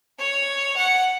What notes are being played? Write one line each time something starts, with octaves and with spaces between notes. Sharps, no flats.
C#5
F#5